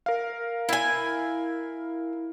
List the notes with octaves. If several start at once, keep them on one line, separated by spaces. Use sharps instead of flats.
A#4 F5
E4 G#5